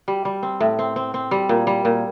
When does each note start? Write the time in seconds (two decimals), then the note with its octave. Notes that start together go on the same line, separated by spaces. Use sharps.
0.08 G3
0.25 G3
0.43 C4
0.60 A2
0.79 C4
0.96 C4
1.14 C4
1.31 G3
1.49 A#2
1.67 G3
1.85 A#2